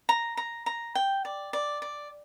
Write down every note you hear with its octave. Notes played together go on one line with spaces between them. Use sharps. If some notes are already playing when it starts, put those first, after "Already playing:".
A#5
A#5
A#5
G5
D5
D5
D5